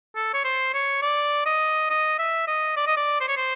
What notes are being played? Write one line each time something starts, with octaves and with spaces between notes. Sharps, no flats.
A4
C#5
C5
C#5
D5
D#5
D#5
E5
D#5
D5
D#5
D5
C5
C#5
C5